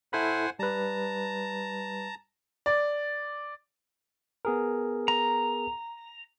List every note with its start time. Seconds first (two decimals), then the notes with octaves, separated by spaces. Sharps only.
0.13 E4 A4 C5 F#5 G#5 B5
0.59 G3 B4 A5 A#5
2.66 D5
4.45 B3 G#4 A#4
5.08 A#5